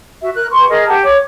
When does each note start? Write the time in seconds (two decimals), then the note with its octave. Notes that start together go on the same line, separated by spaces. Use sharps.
0.21 F#4 E5
0.34 A#4 F#6
0.51 G4 B4 C6 C#6
0.69 G#4 A#4 D#5
0.88 G4 F#5 A5
1.02 C#5 D6